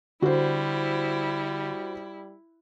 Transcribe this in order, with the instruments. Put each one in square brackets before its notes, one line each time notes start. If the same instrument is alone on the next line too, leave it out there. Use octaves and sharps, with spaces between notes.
[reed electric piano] D3 [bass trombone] G3 [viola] E4 [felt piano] F#4 C5